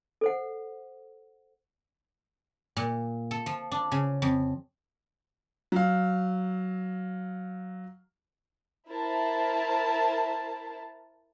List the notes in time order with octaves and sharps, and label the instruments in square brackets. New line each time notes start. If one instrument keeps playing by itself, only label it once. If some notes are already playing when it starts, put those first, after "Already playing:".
[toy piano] A4 C5 F#5
[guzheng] A#2
A4
F3
D4
C#3
F2
[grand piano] F#3 F5
[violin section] E4 A#4 C5 A5